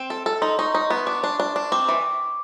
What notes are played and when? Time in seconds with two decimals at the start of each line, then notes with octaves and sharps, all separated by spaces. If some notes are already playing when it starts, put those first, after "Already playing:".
Already playing: C4
0.10 A4
0.26 A4
0.42 D#4 C6
0.59 D#4 C#6
0.75 D#4
0.90 B3
1.06 D4 D6
1.24 D4
1.40 D4
1.56 D4
1.72 C4 D6
1.88 E3